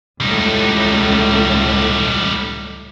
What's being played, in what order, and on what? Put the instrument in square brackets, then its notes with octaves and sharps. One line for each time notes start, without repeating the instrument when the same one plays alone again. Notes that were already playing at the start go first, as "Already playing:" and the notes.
[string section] C#2 A2 [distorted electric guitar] G3 D#4